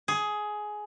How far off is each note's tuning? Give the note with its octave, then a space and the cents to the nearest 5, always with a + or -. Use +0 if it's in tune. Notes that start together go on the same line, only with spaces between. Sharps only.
G#4 +15